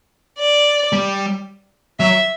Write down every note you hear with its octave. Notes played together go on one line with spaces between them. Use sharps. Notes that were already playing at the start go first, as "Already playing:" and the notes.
D5
G3
F#3 E5